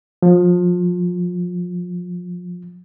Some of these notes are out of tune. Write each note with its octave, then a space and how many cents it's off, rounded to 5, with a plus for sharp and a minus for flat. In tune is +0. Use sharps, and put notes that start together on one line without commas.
F3 +30